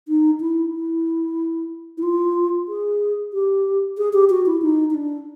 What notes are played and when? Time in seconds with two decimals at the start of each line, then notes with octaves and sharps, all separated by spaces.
0.08 D#4
0.41 E4
0.74 E4
1.98 E4
2.03 F4
2.68 G#4
3.33 G4
3.98 G#4
4.13 G4
4.30 F#4
4.46 E4
4.62 D#4
4.90 D#4
4.94 D4